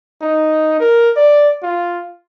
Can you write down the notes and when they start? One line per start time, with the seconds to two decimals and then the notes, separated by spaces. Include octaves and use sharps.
0.22 D#4
0.80 A#4
1.16 D5
1.63 F4